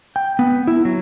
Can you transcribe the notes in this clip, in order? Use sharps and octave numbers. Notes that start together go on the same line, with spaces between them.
G5
B3
E4
F#3